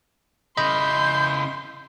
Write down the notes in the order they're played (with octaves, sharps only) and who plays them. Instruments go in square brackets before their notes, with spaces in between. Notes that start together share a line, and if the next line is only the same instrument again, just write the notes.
[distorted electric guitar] C#3 E4 [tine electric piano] D#5 B5 [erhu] C6 [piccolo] G6